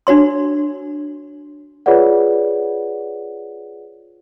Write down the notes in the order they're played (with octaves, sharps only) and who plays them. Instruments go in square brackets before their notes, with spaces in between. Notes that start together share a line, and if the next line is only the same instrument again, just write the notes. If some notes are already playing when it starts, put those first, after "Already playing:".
[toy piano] D4 F#4 C#5 C6
[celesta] F4 G#4 B4 C#5 D5 F#5